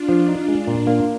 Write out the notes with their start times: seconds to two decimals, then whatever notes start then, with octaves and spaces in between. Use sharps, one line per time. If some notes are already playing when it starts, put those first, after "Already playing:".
Already playing: D4 F4
0.09 F3
0.28 D#4
0.48 G#3
0.67 A#2
0.87 A#3